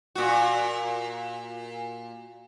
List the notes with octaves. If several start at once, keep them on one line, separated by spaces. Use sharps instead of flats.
A#2 F#4